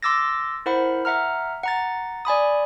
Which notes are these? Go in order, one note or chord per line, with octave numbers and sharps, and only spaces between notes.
C6 D6 E6 A6 A#6
E4 A#4 C5 F#5 B5
E5 F#5 A#5 F6
F#5 A#5 A6
D5 G#5 B5 D#6